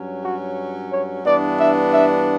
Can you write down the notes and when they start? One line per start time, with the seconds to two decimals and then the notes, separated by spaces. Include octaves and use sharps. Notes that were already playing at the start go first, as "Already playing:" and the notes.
Already playing: G2 F#3 C#4
0.23 F#4
0.90 C#5
1.24 G2 E3 B3 D4 D5
1.58 E5
1.91 E5